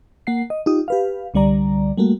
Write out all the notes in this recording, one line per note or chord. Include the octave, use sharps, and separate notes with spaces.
A#3 F#5 C7
D#5
D#4 F4 G4 D#6
G4 B4 F5
C2 D3 G3 D5 A#5
G3 A3 A#3 F#4